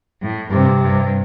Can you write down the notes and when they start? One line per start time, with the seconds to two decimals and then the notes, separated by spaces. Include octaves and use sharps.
0.21 A2
0.50 G2 C3
0.81 G2